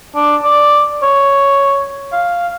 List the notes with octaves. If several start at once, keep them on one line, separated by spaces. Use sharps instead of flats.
D4
D5
C#5
F5